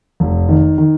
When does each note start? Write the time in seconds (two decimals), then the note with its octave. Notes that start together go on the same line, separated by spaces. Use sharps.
0.20 F1
0.49 D#3
0.78 D#3